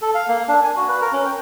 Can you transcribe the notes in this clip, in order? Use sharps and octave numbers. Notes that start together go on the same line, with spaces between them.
A4
F5
A#3
D4
G#5
F#4
B4
A#4
C#4
G5